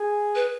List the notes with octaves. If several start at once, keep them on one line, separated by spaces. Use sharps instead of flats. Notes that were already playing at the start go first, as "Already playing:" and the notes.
Already playing: G#4
B4